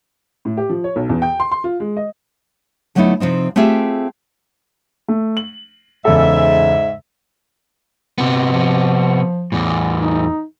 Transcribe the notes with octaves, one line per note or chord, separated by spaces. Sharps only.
A2
G4
F3
C#5
B1
E2
G5
C6
C6
F4
G#3
D#5
D3 F#3 A3 B3 D#4 E4
C3 F3 C4 D#4
A3 C4 F4 G4 G#4 E5
A3
F#7
E2 G#2 C#3 A4 E5
C3 B3
F3
E2 A2
D#4